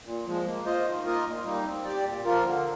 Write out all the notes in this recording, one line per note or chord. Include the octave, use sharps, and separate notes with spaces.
A#2
F3 G#3
A#3
F4 C5 D#5
D#3
A#3 F4 A#4 D#5
A#2
G3 A#3 D#4
C4
G4 D5
A#2
F3 A#3 F4 A#4
D3